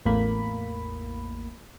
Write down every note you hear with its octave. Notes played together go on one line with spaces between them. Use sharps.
A1 E2 A2 A#3 B5